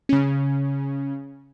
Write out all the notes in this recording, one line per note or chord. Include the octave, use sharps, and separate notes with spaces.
C#3 C#4